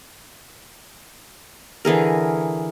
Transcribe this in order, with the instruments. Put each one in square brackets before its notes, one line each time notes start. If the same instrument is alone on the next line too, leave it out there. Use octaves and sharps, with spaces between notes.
[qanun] D3 E3 G#4 A#4